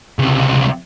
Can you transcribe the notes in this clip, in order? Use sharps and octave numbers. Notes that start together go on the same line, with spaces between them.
C#2 C3